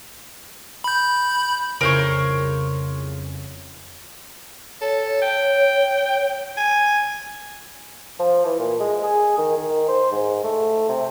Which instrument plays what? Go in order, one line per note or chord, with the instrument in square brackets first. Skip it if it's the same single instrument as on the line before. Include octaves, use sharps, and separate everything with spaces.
[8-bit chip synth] B5 G6
[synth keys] C2 F2 C#3 [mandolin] A#4 C5 C#5
[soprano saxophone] A4 [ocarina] C#5
[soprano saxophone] G5
G#5
[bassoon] F3
E3
A#2
G#3
G#4
D#3
D#3
C5
G#2
A3
C3